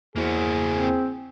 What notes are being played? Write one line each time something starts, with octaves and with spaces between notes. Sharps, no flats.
E2 A#3 E4 F#4 G#4 C5
C4